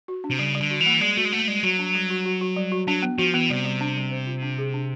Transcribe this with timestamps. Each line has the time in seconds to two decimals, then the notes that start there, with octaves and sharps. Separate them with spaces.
0.08 F#4
0.24 D4
0.31 C3
0.39 C#3 G3
0.55 G3
0.60 D3
0.70 F#4
0.80 E3
0.86 A#3
1.01 G3 G#3
1.17 A3 F#4
1.25 G#3
1.32 A3 A#3
1.47 G3 G#3
1.63 F#3 F#4
1.79 D4
1.95 G3
2.10 F#4
2.25 F#4
2.41 F#4
2.57 G3
2.72 F#4
2.87 F#3 D4
3.03 B3
3.18 F3 F#4
3.34 E3 B3
3.49 C3 G3
3.65 G3
3.81 D4
3.96 G3
4.11 C5
4.27 F4
4.42 D4
4.59 G#4
4.74 D4